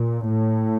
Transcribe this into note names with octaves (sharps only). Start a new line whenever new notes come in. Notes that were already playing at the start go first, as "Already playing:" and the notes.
Already playing: A#2
A2